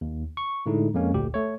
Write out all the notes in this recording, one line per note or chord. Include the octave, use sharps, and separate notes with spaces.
D#2
C#6
A2 D3 G#3 A3 D#4 E4
F2 F3 G#3 A#3 C#4
G#1 D2 A#2 G4
A3 C#5